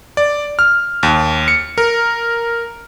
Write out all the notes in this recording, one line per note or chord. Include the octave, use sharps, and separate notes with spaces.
D5
F6
D#2
C#7
A#4